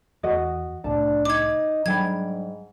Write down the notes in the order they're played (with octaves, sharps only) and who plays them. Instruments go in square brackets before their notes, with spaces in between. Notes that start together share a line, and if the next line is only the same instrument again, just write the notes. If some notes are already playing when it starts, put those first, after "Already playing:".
[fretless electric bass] E2 [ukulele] F#4 D#5
[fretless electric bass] C2 A2 [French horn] D4 [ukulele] A5
[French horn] D#4 [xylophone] D6 G#6
[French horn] G#2 [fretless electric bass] F#3 G3 [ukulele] D4 G5 B5 [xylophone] G#6